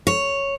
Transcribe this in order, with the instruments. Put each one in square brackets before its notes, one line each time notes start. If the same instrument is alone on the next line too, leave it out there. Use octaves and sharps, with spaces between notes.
[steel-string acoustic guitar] C#5